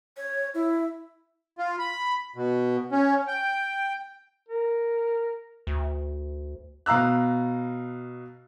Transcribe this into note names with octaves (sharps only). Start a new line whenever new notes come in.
C#5
E4
F4
B5
B2
C#4
G5
A#4
D2
B2 F5 A#5 E6 F#6